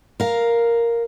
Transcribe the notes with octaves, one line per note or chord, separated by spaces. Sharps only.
A#4 F5